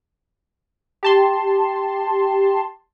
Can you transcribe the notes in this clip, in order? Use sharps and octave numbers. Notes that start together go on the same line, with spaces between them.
G4 A5 C6